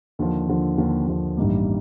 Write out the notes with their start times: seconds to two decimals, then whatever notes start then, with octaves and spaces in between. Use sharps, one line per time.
0.19 D#2 D3 F3
0.48 D#2 D3 F3
0.78 D#2 D3 F3
1.08 D#2 D3 F3
1.37 A1 G2 D#3 G3 A#3